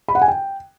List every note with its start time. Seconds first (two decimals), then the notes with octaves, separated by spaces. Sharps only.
0.08 B5
0.15 F#5
0.22 G#5
0.28 G5